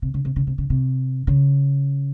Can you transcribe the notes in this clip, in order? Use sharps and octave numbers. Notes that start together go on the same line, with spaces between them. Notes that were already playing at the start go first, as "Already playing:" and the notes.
C3
C#3
C3
C#3
C3
C#3
C3
C#3